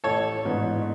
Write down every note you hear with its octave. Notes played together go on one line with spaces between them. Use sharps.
A1 A4 C#5
G#2 E3 B3 D4